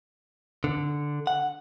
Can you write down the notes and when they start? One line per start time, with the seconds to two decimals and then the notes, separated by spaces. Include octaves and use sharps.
0.64 D3
1.27 F#5